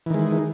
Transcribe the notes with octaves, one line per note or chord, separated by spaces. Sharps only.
D#3 E3 G#3